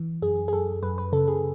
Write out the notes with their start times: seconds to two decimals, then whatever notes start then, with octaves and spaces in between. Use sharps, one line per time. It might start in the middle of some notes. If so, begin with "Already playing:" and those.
Already playing: E3
0.22 F#2 G#4
0.48 G#4
0.53 F#2 A4
0.83 F#2 B4
0.98 B4
1.13 C#3 A4
1.28 G#4